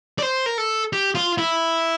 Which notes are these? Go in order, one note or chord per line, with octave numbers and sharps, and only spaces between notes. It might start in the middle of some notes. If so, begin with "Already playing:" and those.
D5
C5
A#4
A4
G4
F4
E4